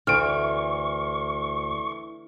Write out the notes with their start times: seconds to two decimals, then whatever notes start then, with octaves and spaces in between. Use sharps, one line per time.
0.07 D2 E3 C#6 F6 D7